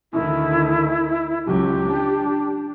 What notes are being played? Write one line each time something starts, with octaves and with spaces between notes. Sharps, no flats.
D2 D#3 E4
C#2 F#3 G4
D4